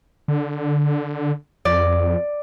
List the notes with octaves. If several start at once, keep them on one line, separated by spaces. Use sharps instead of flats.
D3
F2 D5